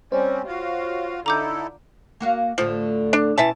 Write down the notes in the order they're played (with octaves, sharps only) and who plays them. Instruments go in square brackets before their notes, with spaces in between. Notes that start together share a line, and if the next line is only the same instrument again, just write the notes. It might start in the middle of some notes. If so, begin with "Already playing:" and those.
[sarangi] G3 [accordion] C4 C#4 [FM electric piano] C5 C#5
[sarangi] F4 [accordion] F#4 F5
[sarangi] D3 [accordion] D#4 E4 A4 [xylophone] A#5 D6 G6
[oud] A#3 F#4 F5
[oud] D2 A2 D3 [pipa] F3
[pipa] D4
[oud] B2 C#4 [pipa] E3 E5 A5